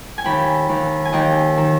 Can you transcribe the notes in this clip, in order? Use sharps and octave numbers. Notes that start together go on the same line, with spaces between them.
G#5
D#2 G5 B5
D#2
G#5
D#2 D#5 G5
D#3